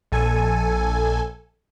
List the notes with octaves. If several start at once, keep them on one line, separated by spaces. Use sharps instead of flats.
A#1 A4 G#5